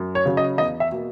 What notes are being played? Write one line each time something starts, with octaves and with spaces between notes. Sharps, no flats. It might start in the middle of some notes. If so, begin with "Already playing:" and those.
Already playing: F#2
C#5
C#3 F#3 C#4
D#5
E2 D#5
E5
B2 A#3